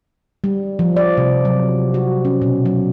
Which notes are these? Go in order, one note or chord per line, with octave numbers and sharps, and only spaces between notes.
G3
F3
D5
C3
F#3
F#4
C#4
B2
F#3